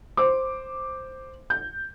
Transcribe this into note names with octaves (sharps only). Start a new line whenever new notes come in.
C5 D6
G6